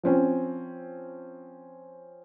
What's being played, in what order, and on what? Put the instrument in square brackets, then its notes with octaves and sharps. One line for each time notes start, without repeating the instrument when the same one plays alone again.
[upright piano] F3 C4 C#4